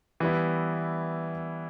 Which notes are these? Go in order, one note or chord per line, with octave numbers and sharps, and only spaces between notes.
E3 G3 B3 E4